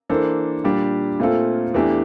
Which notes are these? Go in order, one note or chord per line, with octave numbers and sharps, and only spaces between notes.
E3 A#3 D4 A4 C5
A#2 G3 D4 G4
A#2 A3 C4 F4 A4
E2 E3 A3 D4 G4